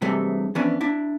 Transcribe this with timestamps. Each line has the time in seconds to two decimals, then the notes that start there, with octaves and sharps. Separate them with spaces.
0.02 G2 C3 E3 F#3 G#3 A3
0.55 E3 F3 B3 C#4 D4
0.81 D4 E4